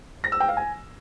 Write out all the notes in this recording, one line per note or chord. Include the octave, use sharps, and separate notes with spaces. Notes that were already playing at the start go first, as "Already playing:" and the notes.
A#6
E6
G5
F5
G#5